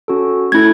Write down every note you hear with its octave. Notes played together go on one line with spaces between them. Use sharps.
C#4 F#4 A4
A3 C#4 E4 A4 G#6